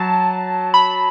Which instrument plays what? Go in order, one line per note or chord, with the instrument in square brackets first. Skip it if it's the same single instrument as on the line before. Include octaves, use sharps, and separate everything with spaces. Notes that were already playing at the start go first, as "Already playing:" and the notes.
Already playing: [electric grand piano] F#3 [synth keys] A5
[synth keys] B5